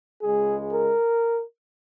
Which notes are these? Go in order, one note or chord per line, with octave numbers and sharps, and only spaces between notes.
C#2 C#3 G#3 G#4
A#4